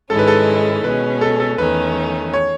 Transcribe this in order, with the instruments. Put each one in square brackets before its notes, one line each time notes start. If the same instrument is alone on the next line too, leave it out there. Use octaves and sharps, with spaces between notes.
[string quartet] G#2 D#3 G#3 C#4 E4 [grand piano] A4
[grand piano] B4
A4
[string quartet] B2 G#3 C#4 [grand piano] B4
[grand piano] A4
A4
[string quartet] E2 D#3 A3 C#4 [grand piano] B4
[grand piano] C#5